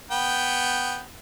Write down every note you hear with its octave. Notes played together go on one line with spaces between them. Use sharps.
B3 G5